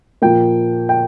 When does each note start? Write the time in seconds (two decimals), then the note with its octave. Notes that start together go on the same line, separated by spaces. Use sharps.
0.22 A#2 F3 A#3 G5
0.89 G5